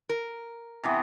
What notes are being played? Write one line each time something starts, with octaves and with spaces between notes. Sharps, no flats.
A#4
C3 E3 B3